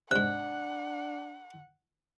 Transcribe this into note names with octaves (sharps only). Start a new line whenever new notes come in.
G#2 C3 D4 F#5 F#6